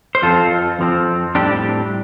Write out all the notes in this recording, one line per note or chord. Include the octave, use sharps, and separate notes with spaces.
C5
F2 F3 C4 F4 A4
F2 F3 C4
A2 G3 C4 D4 G4